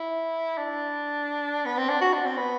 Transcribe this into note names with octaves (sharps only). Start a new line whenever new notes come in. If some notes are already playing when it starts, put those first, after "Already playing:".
Already playing: E4
D4
B3
C4
D4
F#4
D4
C4
B3